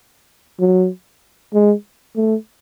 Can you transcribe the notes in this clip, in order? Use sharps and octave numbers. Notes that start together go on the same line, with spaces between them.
F#3
G#3
A3